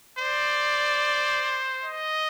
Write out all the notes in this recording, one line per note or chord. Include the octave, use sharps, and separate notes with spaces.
C5 D5
D#5